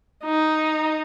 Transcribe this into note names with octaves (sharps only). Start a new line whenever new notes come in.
D#4